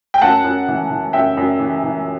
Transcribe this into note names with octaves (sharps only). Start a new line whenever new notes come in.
G5
F#2 F#5 A5
F#2
E3
E3
F#2 E5 G5
F#2
E3
E3